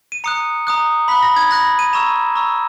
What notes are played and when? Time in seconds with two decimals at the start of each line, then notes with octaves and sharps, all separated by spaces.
0.12 D#7
0.24 A#5 D#6 F#6 C#7
0.67 A#5 D#6 F#6
1.08 B5 F#6 B6
1.23 A#6
1.36 G#6
1.51 B5 F#6 A#6
1.65 A#6
1.79 D#7
1.93 A#5 C#6 E6 E7
2.35 A#5 C#6 E6